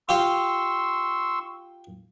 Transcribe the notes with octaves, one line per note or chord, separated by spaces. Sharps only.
F4 G4 F5 C6 C#6 E6